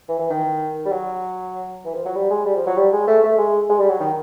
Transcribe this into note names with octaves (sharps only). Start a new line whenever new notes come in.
E3
E3
D#3
G3
F#3
E3
F3
F#3
G3
G#3
G3
F3
F#3
G3
G#3
A3
A3
G#3
G#3
G3
F#3
D#3